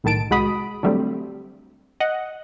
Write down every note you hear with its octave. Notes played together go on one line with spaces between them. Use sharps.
B1 A2 D#3 A5 D7
C2 G#3 F#4 B5 D#6
D3 F#3 G3 A3 C4
D#5 F#5